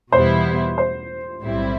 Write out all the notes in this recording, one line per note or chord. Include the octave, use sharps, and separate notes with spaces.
E2 B2 G3 B3 E4 C5
C5
B1 A2 G3 C4 E4